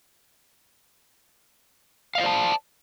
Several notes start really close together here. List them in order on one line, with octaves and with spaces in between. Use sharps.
F5 D#5 C5 D5 A5